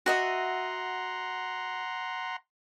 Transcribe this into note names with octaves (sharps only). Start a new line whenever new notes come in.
F#4 D#5 E5 F#5 A#5 C6